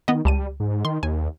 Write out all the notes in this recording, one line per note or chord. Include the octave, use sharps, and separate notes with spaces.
D#3 B3 D#5
C#2 G3 A5 D#7
G#2
D#3 C6
D#2 G#5